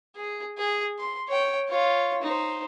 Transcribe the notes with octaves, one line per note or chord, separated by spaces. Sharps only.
G#4
G#4
C6
C#5 G5
F4 C#5
D#4 C5